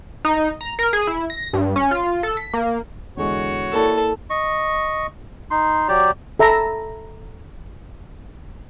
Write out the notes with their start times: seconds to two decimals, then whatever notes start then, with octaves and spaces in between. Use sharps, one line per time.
0.25 D#4
0.61 A#5
0.79 A#4
0.93 G#4
1.07 E4
1.30 A#6
1.53 G2
1.76 C#4
1.91 F4
2.23 A4
2.37 B6
2.54 A#3
3.17 E2 D3 G#3 F#4 C#5
3.73 A#3 E4 A4 D5
4.30 D#5 C#6
5.51 D#4 C6
5.88 F#3 G4 D5
6.39 A4 E5 A#5 B5